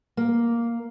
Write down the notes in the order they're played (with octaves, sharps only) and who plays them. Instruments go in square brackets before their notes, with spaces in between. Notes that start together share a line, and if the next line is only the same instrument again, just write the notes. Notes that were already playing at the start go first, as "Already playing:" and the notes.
[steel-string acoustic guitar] A#3